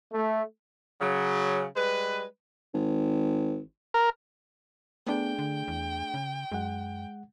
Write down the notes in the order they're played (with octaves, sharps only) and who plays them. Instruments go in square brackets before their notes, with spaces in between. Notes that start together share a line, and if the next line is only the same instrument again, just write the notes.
[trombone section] A3
[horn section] C#3 F#3
G3 G#3 B4
[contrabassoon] G#1
[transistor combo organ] A#4
[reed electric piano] A3 D4 G#4 [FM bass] B3 [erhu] G5
[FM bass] D3
E2
C#3
[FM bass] F#2 [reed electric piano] G#3 F#5